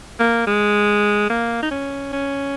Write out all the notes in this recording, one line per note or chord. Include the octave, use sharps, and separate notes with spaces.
A#3
G#3
A#3
D#4
C#4
C#4